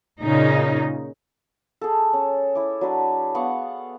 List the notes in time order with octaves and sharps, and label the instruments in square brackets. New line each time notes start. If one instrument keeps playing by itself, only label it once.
[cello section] A#2 C#3 D#4
[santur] G#4 A4
C#4
E4 D6
F#3 D4 B4
B3 F5 F#5 C#6